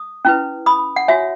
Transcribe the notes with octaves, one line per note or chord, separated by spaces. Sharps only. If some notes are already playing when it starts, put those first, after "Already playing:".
Already playing: D#6
C#4 E4 B4
B5 D#6
F#5
F#4 C#5 E5 G#5